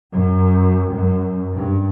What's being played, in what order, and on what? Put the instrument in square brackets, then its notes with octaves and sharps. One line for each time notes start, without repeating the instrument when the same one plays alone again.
[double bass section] F#2
F#2
G2